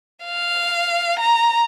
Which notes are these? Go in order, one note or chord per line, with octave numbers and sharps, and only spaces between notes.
F5
A#5